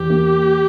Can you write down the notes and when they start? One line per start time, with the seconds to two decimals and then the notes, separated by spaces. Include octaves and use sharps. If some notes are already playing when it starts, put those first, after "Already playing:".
Already playing: E2 G4
0.10 A#3